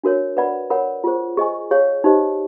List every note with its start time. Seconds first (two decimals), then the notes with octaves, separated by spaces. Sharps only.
0.04 D4 F#4 A#4 C#5
0.37 B4 D5 F#5 B5
0.70 A#4 C#5 F#5 B5
1.04 F4 G#4 C5
1.37 G#4 C5 D#5 G#5 C#6
1.71 G#4 C#5 F5
2.04 D#4 G4 C5 D#5